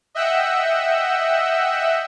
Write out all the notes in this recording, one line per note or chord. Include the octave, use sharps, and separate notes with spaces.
D#5 E5 F#5 G5 E6